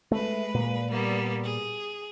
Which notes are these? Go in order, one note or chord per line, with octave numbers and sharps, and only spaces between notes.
G#3 A3 B4
A#2
G3 A#3 B3
G#4